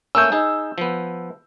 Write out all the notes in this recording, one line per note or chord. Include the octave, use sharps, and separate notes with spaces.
A3 A#3 C#4 E6 G6
D#4 G#4
F3 B3